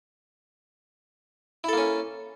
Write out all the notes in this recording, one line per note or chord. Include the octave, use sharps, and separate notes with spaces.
A#3 C#4 E4 A4